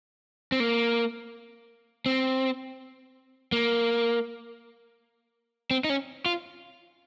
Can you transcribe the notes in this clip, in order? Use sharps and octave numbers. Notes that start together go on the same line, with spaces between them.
C4
A#3
C4
A#3
C4
D#4
C#4
F4